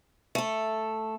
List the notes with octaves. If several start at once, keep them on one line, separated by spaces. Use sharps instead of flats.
A3 A4